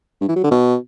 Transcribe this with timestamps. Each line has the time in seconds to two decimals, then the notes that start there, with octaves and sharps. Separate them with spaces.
0.21 G2
0.28 E3
0.36 F#3
0.43 D3
0.51 B2